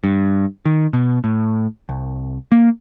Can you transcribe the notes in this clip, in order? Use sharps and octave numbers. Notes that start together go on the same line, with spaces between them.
G2
D#3
B2
A2
C2
A#3